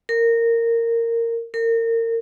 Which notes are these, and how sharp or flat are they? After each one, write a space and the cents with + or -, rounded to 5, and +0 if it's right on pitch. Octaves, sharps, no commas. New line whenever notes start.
A#4 -15
A#4 -30